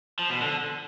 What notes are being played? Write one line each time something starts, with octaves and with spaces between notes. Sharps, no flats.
F3
B2
D3